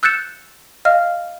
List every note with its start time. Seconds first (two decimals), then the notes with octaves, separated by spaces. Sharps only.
0.03 E6 F#6 G6 A6 C#7 E7
0.85 D#5 F5 F6